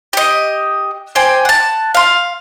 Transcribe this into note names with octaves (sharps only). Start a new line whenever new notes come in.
G4 D#5
C5 D5 G5 G#5
F#5 A5
F5 C6